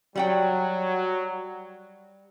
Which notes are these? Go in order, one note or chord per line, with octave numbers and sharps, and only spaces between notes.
F#3 G3 F#5 G5